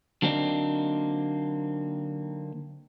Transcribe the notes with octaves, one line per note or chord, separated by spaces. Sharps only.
D3 F#3 A#3 C4 D4 D#4